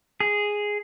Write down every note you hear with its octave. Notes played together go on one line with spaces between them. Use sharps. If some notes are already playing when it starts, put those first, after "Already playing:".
G#4